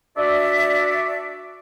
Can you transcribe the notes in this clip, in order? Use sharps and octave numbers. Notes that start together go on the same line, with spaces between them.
D4 F#4 D5 E5